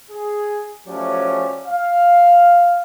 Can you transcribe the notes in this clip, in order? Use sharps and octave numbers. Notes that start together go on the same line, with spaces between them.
G#4
F3 F#3 A3 C#4 G4 D5
F5